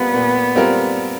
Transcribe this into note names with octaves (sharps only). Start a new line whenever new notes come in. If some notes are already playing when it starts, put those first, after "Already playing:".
Already playing: A#2 G3 B3 C4 F4 A#4
A#2
G3 C4 F4 A#4